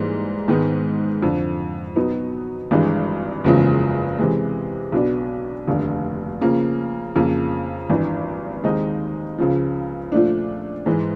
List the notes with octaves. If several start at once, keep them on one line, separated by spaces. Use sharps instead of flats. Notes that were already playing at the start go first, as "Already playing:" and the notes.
Already playing: G#2 E3 G3 A#3
G#2 D#3 G#3 B3
F2 D3 F3
B2 F#3 B3 D#4
G#1 G2 E3 G#3
F#1 E2 C#3 F3 G#3
C3 E3 G#3
B1 B2 F#3 B3 D4
F1 D#2 D3
C#3 F3 A#3
F2 C#3 F3 A#3
G#1 G2 E3
D#2 D#3 G#3 C4 D#4
C#2 C#3 F3
A#2 F3 A3 D4
G#2 E3 G#3